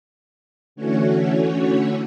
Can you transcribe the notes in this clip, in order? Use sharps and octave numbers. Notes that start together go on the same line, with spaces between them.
D3 E3 A3 C#4 F#4 C#5